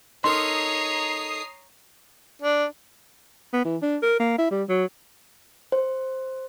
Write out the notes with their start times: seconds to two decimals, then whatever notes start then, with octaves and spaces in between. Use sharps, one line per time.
0.24 D#4 A4 A#4 C#5 A#5 C6 D#6 C7
2.42 D4
3.53 B3
3.65 E3
3.82 D4
4.02 A#4
4.20 A#3
4.38 E4
4.51 G3
4.69 F#3
5.72 C5